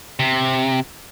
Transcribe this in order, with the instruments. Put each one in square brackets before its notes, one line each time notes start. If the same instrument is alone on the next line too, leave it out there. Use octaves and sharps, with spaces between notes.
[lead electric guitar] C3